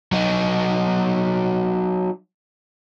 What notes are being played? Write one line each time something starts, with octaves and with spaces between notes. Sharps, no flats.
F#3 D#4